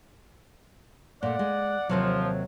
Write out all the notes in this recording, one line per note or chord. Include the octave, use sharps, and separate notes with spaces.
A#2 A3 D5 F#5
G#3
D#2 C3 F3 F#3